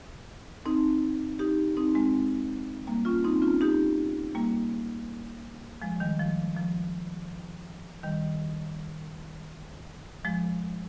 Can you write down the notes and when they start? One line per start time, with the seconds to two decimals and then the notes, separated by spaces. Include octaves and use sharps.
0.65 C4 D#4
1.39 D#4 G4
1.77 C4 D#4
1.95 G#3 C4
2.87 G3 A#3
3.05 C#4 F4
3.24 C4 D#4
3.42 C#4 F4
3.61 D#4 G4
4.35 G3 A#3
5.82 F3 G#3
6.00 D#3 G3
6.19 F3
6.56 F3
8.03 D#3 G3
10.25 F3 G#3